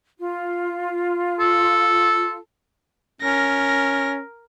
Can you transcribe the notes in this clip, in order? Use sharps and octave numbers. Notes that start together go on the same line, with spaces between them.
F4
A4
C#4 A#4 A#6